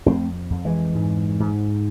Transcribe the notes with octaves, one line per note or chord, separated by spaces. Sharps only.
F2 A3 C4
F2
E3 G#3
G#2
G#2